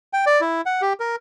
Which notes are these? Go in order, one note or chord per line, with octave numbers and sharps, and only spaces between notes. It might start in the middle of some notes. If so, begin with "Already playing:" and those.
G5
D5
E4
F#5
G4
A#4